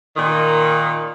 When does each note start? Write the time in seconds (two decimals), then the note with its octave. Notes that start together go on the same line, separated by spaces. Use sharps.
0.17 A#2 D#3